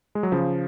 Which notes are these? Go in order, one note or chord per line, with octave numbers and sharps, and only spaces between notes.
G#3
F#3
C#3 F3